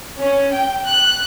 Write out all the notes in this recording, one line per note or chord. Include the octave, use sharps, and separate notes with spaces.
C#4
G5
F#6